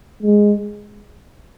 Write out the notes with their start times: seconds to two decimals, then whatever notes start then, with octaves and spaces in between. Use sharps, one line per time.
0.23 G#3